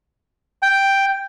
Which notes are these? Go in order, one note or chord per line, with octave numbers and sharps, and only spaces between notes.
G5